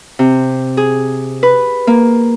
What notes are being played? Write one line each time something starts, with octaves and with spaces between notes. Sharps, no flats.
C3
G#4
B4
A#3